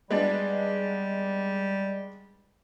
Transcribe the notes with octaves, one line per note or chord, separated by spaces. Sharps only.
G3 G#3 B3 D4